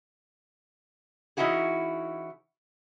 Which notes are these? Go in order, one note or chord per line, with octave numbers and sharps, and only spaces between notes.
E3 C#4 D#4 E4 F#4 G#4